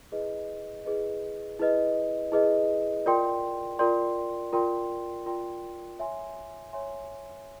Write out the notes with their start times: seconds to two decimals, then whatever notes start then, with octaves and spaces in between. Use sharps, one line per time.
0.12 E4 G#4 B4 D#5
0.85 E4 G#4 B4 D#5
1.59 E4 G#4 B4 D#5
2.32 E4 G#4 B4 D#5
3.06 F4 A#4 D5 G5 C6
3.79 F4 A#4 D5 G5 C6
4.53 F4 A#4 D5 G5 C6
5.26 F4 A#4 D5 G5 C6
5.99 C#5 E5 G#5 C6
6.73 C#5 E5 G#5 C6